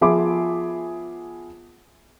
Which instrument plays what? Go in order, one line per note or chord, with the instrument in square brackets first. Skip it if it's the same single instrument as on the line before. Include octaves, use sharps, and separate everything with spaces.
[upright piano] F3 B3 G#4 E5 B5 D6